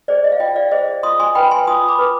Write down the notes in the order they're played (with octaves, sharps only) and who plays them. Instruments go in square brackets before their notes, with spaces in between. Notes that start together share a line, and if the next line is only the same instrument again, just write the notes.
[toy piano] G#4 C5 D5
D#5
F5
F4 D#5 G5
D5 F5
G#4 C5 D#5
F4 C6 D#6
G#5 C6
B4 G5 B5
G#5 C6
F4 C6 D#6
B5 D6
B4